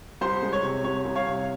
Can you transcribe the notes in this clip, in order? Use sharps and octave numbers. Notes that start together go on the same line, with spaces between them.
C2 C5
G#3
C#5
C3
C2 C#5
C2
C#5 F5
C3